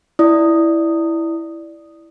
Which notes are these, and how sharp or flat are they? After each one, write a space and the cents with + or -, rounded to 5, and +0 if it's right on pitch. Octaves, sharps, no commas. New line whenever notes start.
E4 +0 D5 +0 D#6 -5